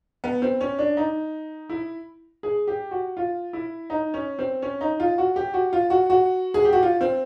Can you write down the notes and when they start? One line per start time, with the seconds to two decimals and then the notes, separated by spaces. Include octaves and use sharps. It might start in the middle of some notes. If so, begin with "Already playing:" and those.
0.24 B3
0.42 C4
0.61 C#4
0.79 D4
0.97 D#4
1.69 E4
2.43 G#4
2.68 G4
2.91 F#4
3.17 F4
3.53 E4
3.90 D#4
4.14 C#4
4.39 C4
4.62 C#4
4.81 D#4
5.00 F4
5.18 F#4
5.36 G4
5.54 F#4
5.73 F4
5.90 F#4
6.10 F#4
6.54 G#4
6.65 G4
6.73 F#4
6.83 F4
7.01 C4